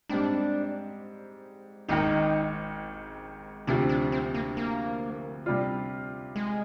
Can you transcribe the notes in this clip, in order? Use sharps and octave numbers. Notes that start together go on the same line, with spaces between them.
G#2 G3 C4 D4 G4
G#1 G#2 D#3 D#4
D2 C3 F3 D4
D4
C4
A#3
A#3
C3 G3 D4 F4
G#3